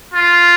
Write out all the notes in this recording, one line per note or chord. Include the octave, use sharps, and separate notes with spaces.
F4